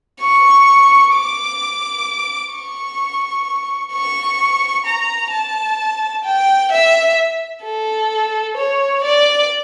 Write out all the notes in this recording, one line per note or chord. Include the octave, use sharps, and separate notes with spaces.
C#6
D6
C#6
C#6
A#5
A5
G5
E5
A4
C#5
D5